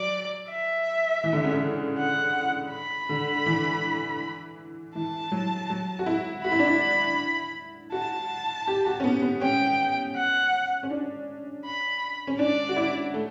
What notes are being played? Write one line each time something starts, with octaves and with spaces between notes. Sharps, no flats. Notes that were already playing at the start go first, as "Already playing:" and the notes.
Already playing: F#3 D5
E5
E3
D3
C#3
D3
F#5
B5
D3
E3
E3 A5
F#3
F#3
F#4
E4
F#4 B5
E4
D4
E4
F#4 A5
G4
F#4
C#4
B3
B3
C#4 G5
F#5
C#4
D4
B5
C#4
D4 D5
F#4
E4
A3